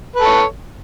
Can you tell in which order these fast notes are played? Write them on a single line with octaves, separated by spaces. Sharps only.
B4 A4 C#5